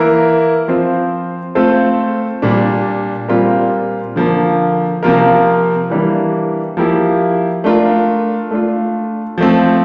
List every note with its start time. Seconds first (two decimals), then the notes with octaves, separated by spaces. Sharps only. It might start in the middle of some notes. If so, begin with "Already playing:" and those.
Already playing: E3 A#3 E4 A#4
0.68 F3 C4 F4 C5
1.55 A3 C4 F4 A4 C5
2.42 A#2 G3 D4
3.28 A#2 G3 C4 F4 A#4
4.16 D3 F3 A#3
5.03 C3 F3 A#3 F4 A#4
5.90 E3 G3 A#3 D4
6.77 F3 A#3 E4 G4
7.64 A3 D4 F4 A#4
8.51 A3 D4 F4
9.38 F3 A3 C4